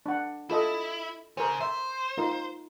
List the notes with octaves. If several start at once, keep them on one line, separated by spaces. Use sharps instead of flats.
D4 F#5
E4 F4 A4 D#5
C#3 A#4 C5
C5 E5
D#4 F4 A#4